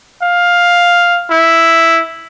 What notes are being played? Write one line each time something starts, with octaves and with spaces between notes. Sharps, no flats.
F5
E4